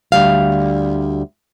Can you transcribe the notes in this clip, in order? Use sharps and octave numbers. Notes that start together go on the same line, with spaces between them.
D2 G3 F5